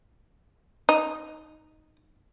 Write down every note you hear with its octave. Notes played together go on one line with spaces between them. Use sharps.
D#4